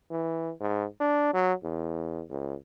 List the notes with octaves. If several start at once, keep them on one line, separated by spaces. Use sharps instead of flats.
E3
G#2
D4
F#3
E2
C#2